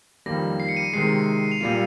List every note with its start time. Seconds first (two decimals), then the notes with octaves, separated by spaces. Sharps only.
0.26 F2 D#3 G3 A#3 A#6
0.60 C7
0.69 C#7
0.77 D#7
0.93 C3 D#3 G#3 C7
1.52 F7
1.61 A#2 G3 A#3 F4 D#7